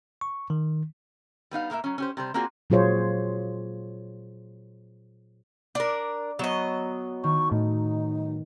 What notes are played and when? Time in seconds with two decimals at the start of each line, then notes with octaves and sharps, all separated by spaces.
0.21 C#6
0.50 D#3
1.51 G3 B3 D#4 F5
1.70 A2 A#3 A#4 E5
1.84 F#3 C#4
1.98 C#4 G4 C5
2.17 C3 G3 C5
2.34 A#3 C4 F4 F#4 G#4 D5
2.70 A#2 F#3 F4 G#4 C5 C#5
5.75 D4 A#4 D5
6.39 F#3 B3 C#5 D#5 E7
7.24 D#3 C#6
7.52 A2 D#4